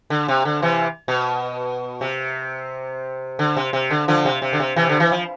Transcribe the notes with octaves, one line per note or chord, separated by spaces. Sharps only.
D3
C3
D3
C3 E3
B2
C3
D3
C3
C3
D3
D3 F3
C3
C3
D3
C3
C3 E3
D3
E3
F3